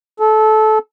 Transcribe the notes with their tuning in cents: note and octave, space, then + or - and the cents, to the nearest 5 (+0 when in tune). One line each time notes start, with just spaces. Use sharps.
A4 -20